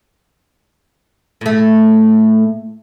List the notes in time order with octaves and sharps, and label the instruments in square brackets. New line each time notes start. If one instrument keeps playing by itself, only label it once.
[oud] A2 A3